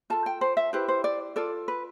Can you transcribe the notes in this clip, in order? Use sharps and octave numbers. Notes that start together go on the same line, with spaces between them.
F4 A4 A5
G5
C5
E5
E4 G4 B4 C5
C5
D5
F4 A4 D5
B4